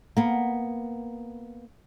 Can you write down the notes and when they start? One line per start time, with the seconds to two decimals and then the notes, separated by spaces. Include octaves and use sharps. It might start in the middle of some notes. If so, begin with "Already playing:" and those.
0.17 A#3 B3